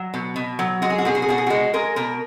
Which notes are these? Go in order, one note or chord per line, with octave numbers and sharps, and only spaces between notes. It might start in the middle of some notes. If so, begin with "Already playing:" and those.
Already playing: F#3
B2
B2
F#3
G#3 F#4
G#4
F#4
B2 G#4
F#4
G#4
B2 F#4
G#4
G#3 F#4
G#3 A#4
B2 A#4